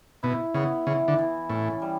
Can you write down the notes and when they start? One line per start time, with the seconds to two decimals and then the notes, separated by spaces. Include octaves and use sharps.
0.23 B2 E4
0.54 C#3 B3
0.87 C#3 E3
1.08 D3
1.18 E3
1.49 A2 C#4
1.82 G3